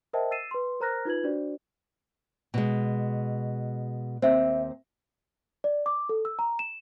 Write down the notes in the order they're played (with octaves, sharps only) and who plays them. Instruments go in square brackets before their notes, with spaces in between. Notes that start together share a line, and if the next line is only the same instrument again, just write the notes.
[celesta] A#4 C5 D#5 E5 G5 A5
E6 A6 C7 D#7 E7
B4 C6
A#4 C5 A#5 F6 F#6 A#6
D#4 F4 B4 G#6 F#7
D4 F#4 C5 D5
[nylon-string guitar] B2 G#3
[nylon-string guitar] D#2 C4 [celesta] C5 E5
[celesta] D5
D6
A4
E6
A#5
E7